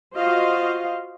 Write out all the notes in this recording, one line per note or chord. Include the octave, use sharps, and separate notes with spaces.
F4 F#4 C5 D#5 F5